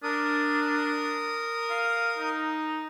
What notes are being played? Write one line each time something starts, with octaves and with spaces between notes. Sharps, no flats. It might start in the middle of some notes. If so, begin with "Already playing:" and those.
D4 A#4 D#6
F5
D#4